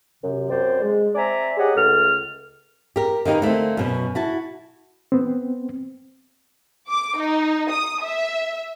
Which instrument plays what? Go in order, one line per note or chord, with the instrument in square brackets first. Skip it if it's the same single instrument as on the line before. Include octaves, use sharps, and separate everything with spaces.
[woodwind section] F#2 C3
F#2 C4 C5 D5
G#3
C4 D5 E5 G#5 A#5
G4 G#4 C#5 D#5 F#5
C#2 A3 A4 F6
[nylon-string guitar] G4 A#4
D#3 A#3 D#4 G4 B4
D3 A3 A#3 C4
F#2 B2 C#4
E4 F#4 A5
[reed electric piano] B3 C4
[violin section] D6
D#4
D#6
E5